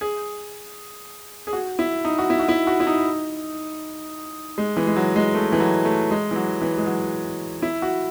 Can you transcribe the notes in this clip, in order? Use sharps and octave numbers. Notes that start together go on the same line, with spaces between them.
G#4
G#4
F#4
E4
D#4
F#4
E4
F#4
E4
F#4
E4
D#4
G#3
E3
G#3
F#3
G#3
A3
E3
F#3
A3
G#3
E3
F#3
E3
G#3
F#3
E4
F#4